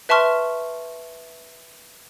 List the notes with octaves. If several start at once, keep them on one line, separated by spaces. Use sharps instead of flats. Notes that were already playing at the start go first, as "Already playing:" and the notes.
B4 E5 A5 C6 C#6 F6